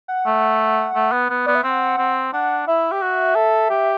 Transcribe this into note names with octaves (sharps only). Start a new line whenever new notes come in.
F#5
A3
A3
B3
B3
B3 D5
E5
C4 F#5
C4
D4 F#5
E4 E5
G4
F#4
A4
G4